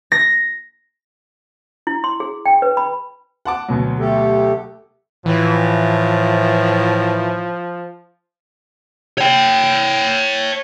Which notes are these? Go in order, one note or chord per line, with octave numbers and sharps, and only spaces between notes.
A#6
E4
C6
G#4
G5
B4
B5
F#5 A5 D6
D2 B2 F#3
A3 G4 A4
A2 E3 F3
C#5 G5